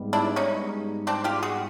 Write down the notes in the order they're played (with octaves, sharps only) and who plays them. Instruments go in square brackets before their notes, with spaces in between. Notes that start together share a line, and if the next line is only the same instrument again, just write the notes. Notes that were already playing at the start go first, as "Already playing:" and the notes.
Already playing: [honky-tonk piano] G#2 G3 B3
[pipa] D4 E4
C#4 D#4
C4 D4
F4 G4
F#4 G#4